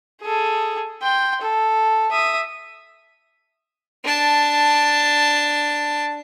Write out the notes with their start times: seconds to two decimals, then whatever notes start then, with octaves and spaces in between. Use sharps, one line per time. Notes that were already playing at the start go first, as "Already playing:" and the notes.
0.22 G#4 A4
1.02 G5 C6
1.41 A4
2.12 E5 D#6
4.05 D4 A5